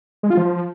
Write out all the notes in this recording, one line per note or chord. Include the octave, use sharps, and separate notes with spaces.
G#3
F4
F3